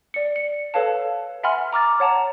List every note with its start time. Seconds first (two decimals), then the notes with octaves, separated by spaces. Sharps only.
0.14 D5 C#7
0.36 C#7
0.74 A4 B4 C#5 F5 A5
1.43 E5 F#5 G#5 B5 C6 F6
1.73 A#5 D6 F6 A6
2.00 C#5 F#5 A5 A#5